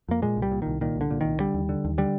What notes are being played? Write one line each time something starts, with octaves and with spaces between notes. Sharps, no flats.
F2 A#3
A#2 G#3
C2
G3
A#2
C2 D#3
A#2 D#3
C2
D3
A#2
C2 D#3
D3 G3
D#2
D3
D#2
D3 G3